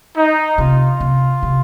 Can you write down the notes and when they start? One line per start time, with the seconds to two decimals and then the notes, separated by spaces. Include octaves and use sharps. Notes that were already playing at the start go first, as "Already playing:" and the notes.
0.16 D#4
0.58 C3 F4
1.00 C3
1.43 C3